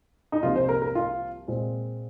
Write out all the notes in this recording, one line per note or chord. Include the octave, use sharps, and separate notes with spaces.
D#4
C2 C3 F3 A#3 F4
C5
A#4
A#4
F4
A#2 G#3 C4